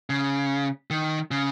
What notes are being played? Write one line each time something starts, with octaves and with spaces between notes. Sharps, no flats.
C#3
D#3
C#3